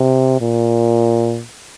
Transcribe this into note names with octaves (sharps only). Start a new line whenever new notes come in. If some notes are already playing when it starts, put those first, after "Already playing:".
Already playing: C3
A#2